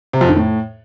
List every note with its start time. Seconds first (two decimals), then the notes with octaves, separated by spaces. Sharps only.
0.13 C3
0.21 F2
0.29 D#3
0.36 A2